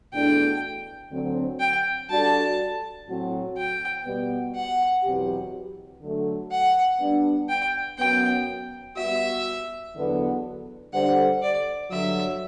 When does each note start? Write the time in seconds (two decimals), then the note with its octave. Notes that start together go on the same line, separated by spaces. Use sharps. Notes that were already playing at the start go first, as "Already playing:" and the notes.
0.13 E2 B2 A3 D4 G5
1.11 D2 D3 F#3 C4
1.60 G5
2.09 G3 D4 F#4 A4 D5 A5
3.07 A2 F#3 C4 F#4
3.57 G5
4.05 B2 G3 B3
4.55 F#5
5.03 E2 B2 F#3 C4 G4
6.02 D3 F#3 A3
6.52 F#5
7.00 G3 B3 D4
7.49 G5
7.98 F#2 F#3 B3 G5
8.97 G3 B3 F#4 E5
9.95 E2 D3 F#3 B3
10.93 D3 G3 D4 A4 C5 F#5
11.42 D5
11.91 G2 D3 F#3 E5